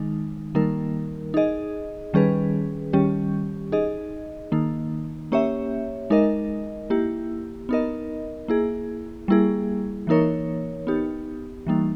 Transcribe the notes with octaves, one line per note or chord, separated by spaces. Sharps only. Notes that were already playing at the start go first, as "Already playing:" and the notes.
Already playing: D#3 G#3 D#4
D#3 G3 A#3 D#4 A#4
D#4 G#4 D#5
D#3 G3 C#4 G#4 B4
D#3 G3 C#4 G4
D#4 G#4 D#5
D#3 A#3 D#4
A#3 C#4 G4 C#5 E5
G#3 D#4 A#4 D#5
A#3 E4 G4
B3 D#4 A#4 D#5
A#3 E4 G#4
G3 A#3 E4 G#4
E3 A#3 D#4 A#4 C#5
B3 D#4 G4
E3 G3 A#3 D#4